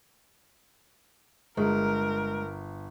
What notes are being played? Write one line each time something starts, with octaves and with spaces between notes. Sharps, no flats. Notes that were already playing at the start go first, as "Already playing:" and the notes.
G1 G#3 A#4